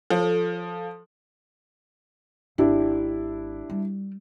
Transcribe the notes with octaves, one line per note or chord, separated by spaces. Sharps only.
F3 A4
G#1 D4 E4 G4
G3